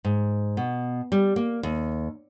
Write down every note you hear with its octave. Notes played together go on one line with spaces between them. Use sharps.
G#2
B2
G3
A#3
D#2